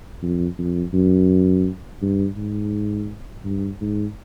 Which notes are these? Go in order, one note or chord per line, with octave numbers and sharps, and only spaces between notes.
F2
F2
F#2
G2
G#2
G2
G#2